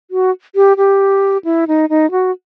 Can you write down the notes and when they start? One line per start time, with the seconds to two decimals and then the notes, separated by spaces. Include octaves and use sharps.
0.11 F#4
0.55 G4
0.77 G4
1.45 E4
1.68 D#4
1.90 D#4
2.11 F#4